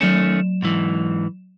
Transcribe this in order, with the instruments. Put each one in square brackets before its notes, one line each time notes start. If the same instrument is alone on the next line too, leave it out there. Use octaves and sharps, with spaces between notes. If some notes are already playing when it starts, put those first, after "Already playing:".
[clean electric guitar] D#3 A3 C#4 [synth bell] F#3 E7
[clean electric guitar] G#2 E3